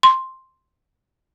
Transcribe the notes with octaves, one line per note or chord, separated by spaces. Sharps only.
C6